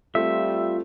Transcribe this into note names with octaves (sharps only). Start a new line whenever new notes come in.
G3 A3 C4 F4 E5